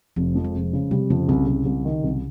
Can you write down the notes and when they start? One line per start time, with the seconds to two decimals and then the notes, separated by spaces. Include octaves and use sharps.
0.16 F1 F3
0.35 F2
0.45 G#3
0.54 F1
0.73 C#3
0.91 C3 G3
1.10 F2 C#3
1.28 C2 C#3
1.47 C2
1.66 C2
1.85 D#3
2.04 C2